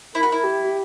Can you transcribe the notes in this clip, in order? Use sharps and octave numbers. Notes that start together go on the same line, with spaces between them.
E4 A#4
F#4
E4
G4